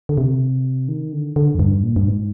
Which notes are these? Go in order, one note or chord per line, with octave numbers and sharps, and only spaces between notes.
D3
C3
D#3
D3
D3
F2
G2
A#2
G2
G#2